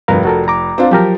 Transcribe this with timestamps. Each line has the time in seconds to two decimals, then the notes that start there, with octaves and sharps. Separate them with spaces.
0.08 F1 G2 A#4 B4 F5
0.25 F#4 A4 A#4
0.48 A#5 D6
0.78 C4 D4 F4
0.91 F3 F#3 G4 A#4